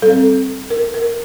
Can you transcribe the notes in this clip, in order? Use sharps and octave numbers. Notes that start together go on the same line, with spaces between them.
G3 C4 A4
A#4
A#4